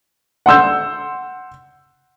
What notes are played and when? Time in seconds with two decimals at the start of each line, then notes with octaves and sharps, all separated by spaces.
0.46 F#5 C6 E6 G6